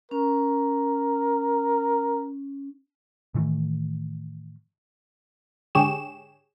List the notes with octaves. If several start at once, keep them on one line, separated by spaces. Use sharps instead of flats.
C#4 A#4
A2 D#3 E3 A3
G#2 D3 G4 G#4 C#5 E7